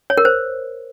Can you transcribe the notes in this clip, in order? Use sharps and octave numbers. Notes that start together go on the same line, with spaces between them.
C#5
A#4
C5